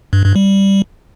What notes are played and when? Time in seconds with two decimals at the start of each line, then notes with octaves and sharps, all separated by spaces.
0.13 G2
0.24 G2
0.36 G3